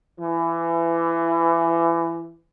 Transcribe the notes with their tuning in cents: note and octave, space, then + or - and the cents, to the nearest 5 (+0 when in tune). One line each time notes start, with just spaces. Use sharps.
E3 +25